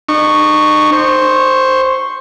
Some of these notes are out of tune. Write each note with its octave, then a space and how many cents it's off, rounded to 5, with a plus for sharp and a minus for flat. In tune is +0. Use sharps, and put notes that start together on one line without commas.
D#4 -40 C#6 +0
C5 +0 C#6 -10